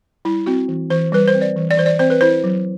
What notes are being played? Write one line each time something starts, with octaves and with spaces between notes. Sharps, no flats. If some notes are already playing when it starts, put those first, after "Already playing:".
G3 E4
C4 F#4
E3
E3 C5
G3 B4
C5
C4
D5
E3
D5
E3 C5
D5
C4 C5
B4
E4 C5
F#3